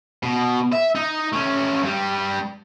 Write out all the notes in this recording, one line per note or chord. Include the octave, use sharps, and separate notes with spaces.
B2
E5
D#4
A3 C#4
G2 G3